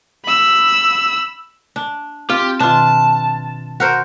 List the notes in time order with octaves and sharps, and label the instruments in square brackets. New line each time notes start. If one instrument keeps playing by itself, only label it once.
[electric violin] B5 E6
[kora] D4
[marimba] C4 [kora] F4 [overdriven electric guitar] G4
[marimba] B2 D#3 C6 [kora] D4 F4 [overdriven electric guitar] A5
[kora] F#4 A#4 C5